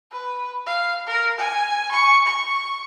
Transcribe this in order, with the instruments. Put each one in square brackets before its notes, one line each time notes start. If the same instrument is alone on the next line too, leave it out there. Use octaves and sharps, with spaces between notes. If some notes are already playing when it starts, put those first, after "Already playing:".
[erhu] B4
F5
A#4
G#5
C#6
C#6